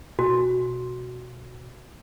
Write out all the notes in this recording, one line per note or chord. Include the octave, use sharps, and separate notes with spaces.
B2 F#4